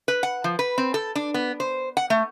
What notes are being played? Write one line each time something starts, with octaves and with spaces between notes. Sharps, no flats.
B4
F#5
F3
B4
C4
A4
D4
B3
C5
F#5
A3